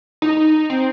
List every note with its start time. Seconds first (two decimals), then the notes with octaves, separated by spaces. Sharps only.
0.22 D#4
0.70 C4